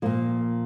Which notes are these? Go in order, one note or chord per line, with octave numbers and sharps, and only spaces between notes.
A#2 F3 A#3